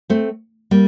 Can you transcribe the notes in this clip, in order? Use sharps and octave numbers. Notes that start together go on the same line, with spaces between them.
A3 C4
G3 A#3